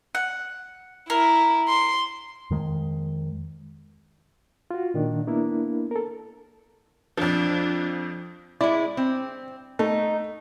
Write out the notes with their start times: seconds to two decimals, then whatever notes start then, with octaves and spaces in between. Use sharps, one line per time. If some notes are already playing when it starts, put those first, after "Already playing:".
0.15 F#5
1.10 E4 A#4
1.68 C6
2.50 F2 D#3 G#3
4.71 F4 F#4
4.94 A#2 D#3 D4
5.27 A#3 B3 D4 E4 A#4
5.91 A4 A#4
7.18 F2 F3 D4
8.61 G#3 E4 D5
8.97 C4
9.79 A3 D#4